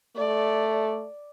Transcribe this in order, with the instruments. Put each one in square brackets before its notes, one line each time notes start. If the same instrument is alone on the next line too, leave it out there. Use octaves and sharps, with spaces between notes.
[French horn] A3 [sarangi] D5